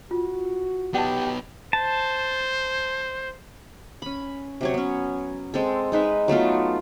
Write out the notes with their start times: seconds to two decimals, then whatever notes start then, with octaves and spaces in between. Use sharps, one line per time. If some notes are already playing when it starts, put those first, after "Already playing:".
0.11 F4 F#4
0.94 B3 D#4 G4 F#5 A5
1.73 C5 A5
4.02 C#4 B5
4.61 C3 F#3 C#5
4.74 B3 C#4
5.54 G#3 C4 A4
5.92 G#3 D#4 B4 E5
6.28 F#3 A3 B3 F4